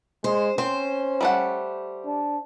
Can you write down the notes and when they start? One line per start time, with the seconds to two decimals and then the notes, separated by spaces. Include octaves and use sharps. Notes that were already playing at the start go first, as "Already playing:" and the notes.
0.24 G#3 C5
0.58 C4 C#4 C5
1.21 G3 A3 F#5
2.06 D4